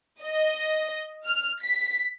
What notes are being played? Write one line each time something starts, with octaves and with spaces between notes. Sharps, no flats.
D#5
F6
B6